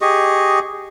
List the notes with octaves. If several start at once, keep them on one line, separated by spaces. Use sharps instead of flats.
G4 G#4 D#5 C#6